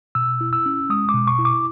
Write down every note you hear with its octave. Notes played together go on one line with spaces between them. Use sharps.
B2 E6
E4
E6
C#4
G#3 D#6
D6
B2
C#6
E4
D6